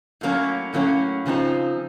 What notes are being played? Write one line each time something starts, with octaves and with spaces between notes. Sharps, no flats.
A2 F#3 A#3 C#4
A2 F#3 A#3 C#4
C#3 F3 C4 D#4